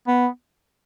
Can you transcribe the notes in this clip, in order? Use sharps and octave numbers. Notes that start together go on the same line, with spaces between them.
B3